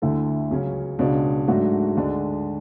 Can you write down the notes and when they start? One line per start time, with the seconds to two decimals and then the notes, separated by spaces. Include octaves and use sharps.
0.02 D2 D3 A3 E4 A4
0.50 C#2 C#3 F#3 C#4
0.99 C#2 B2 G#3 D4
1.48 G#2 F#3 A3 D4 F#4
1.97 D2 D3 G#3 D4